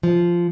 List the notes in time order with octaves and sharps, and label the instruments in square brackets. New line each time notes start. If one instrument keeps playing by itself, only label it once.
[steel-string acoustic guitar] F3